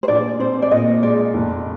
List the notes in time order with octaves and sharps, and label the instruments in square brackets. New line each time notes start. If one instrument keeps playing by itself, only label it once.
[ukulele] C5
[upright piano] A#1 [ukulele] D5
[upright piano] C4 [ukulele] C5
[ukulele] D5
[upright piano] A#2 [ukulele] D#5
[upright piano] G#3 [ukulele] D5
[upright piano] F1